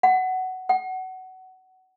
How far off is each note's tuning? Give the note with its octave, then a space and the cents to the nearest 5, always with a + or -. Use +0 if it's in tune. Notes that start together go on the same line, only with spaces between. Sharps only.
F#5 +10
F#5 +20